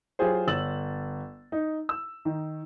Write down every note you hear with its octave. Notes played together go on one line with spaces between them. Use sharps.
F#3 F4 G4 G#4 C5
G1 C#5 E6 A6 F#7
D#4
E6
D#3 D#4